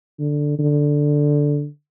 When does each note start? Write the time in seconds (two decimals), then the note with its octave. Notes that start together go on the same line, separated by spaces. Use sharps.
0.19 D3
0.59 D3